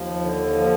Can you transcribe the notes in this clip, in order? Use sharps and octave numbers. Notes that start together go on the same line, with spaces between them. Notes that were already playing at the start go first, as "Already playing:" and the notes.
Already playing: D#2 F3
D3
F3